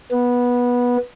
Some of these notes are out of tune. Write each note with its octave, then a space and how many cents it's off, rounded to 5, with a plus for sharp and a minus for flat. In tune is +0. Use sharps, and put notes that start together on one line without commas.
B3 -15